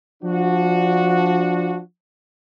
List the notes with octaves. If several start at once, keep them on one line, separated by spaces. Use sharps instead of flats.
F3 D4 F#4